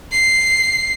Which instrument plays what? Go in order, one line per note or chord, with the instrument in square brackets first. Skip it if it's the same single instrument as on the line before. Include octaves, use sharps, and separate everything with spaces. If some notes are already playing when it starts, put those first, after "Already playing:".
[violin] C7